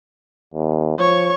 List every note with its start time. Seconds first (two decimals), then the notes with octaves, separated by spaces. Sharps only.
0.54 D#2
0.98 F3 C#5 C#6